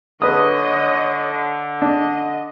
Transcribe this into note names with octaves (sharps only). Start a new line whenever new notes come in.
D3 B4 C#5 D#5 D#6
D4 D#5